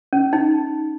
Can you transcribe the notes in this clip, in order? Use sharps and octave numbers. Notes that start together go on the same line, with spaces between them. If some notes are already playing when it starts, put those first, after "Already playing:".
C#4
D#4